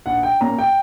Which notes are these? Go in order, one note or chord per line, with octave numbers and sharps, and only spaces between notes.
A#1 F#5
G5
A#2 A#3 C#4 A#5
G5